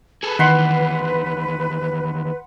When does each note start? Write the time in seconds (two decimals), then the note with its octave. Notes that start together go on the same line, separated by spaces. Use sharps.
0.23 G#4 A4 B4
0.39 D#2 D#3 E3 F#5 B5 C6